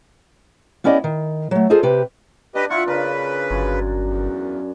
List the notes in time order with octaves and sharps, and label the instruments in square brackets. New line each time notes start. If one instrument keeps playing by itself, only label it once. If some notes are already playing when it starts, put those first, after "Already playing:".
[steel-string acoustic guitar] B3 C#4 E4 G4 D5 D#5
D#3
F#3 A3
F4 G#4 A4 C5 D#5
C3 G4 B4
[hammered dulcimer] D4 [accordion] G4 B4 D#5
[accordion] E4 F#5 C#6 [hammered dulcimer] F4
[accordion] C#3 B4 [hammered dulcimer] D4 A#4
[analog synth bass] G1 [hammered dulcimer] F#2
[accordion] E2